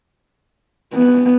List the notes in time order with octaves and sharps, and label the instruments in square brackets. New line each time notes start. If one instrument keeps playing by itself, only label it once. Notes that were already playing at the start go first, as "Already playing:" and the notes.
[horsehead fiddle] B3